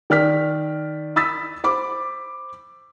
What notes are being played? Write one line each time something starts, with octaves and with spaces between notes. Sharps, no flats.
D#3 D5 F6 B6
B5 D#6 E6 A6 B6
C5 B5 D6